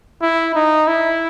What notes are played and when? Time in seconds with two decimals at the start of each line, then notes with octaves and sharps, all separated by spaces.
0.22 E4
0.55 D#4
0.88 E4